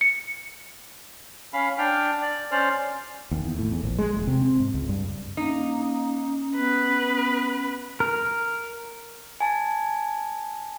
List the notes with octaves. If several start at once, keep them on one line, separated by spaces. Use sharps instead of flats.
C#7
C#4 F5 B5
D4 G5 F6
D5
C#4 C5 D5 F6
D#2
E2
A2
E2
A#1
G#3
E1
C3
C4
G#2
C#2
G2
A#3 C#4 D#4
B3 B4
A#4
G#5 A5